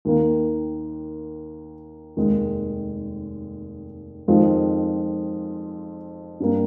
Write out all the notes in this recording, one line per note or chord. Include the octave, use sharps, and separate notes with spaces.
D#2 D#3 A#3
F1 D#2 D#3 G#3
F2 D#3 G#3 C4 F4
G2 G3 A#3